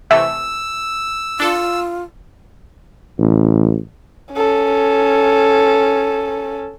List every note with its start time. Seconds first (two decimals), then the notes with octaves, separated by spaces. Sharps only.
0.11 C3 E3 A3 E5 E6
1.40 D4 F4 A4
3.19 A1
4.33 C#4 A4